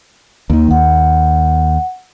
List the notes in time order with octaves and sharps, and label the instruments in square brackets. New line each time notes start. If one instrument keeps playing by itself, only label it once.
[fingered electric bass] D#2 D#3 [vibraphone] A#3
[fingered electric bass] D#2 [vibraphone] F#5